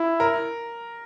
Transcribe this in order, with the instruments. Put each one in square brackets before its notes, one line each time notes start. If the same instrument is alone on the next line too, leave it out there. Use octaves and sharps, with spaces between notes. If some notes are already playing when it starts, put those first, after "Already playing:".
Already playing: [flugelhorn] E4
[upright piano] A#4